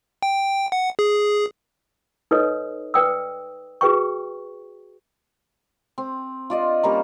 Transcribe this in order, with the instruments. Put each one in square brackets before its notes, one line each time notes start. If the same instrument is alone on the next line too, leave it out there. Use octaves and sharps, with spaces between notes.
[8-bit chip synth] G5
F#5
G#4
[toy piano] D#4 A4 B4 C#5 D#5 D#6
B4 D5 G5 D#6 E6
F#4 G#4 B4 G5 C#6
[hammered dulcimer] C4
F4 D5 D#5
G3 A#3 C#4 A#4